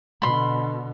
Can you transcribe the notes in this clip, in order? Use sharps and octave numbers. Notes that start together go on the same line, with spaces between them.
B2 D3 B5 C6